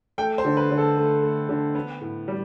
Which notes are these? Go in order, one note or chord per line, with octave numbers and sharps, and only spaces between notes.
A3 G5
C5
D3
B4
D3
A4
A3
A3
D3
B3
A2
G3